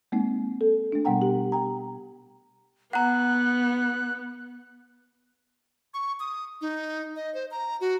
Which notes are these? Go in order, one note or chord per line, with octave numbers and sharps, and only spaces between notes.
G#3 A#3 C4 D#4
A4
A3 D4
B2 G3 B3 F#5 G5 A#5
G4
G5 A#5
B3 F#5 A#5 F#6
C#6
D#6
D#4
D#5
C5
A#5
F#4